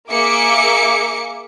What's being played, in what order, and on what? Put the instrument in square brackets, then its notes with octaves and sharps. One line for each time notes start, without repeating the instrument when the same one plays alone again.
[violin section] A#3 G#4 E5 D6 C#7 D7